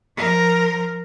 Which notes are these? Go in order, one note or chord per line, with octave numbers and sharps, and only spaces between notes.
F3 A#4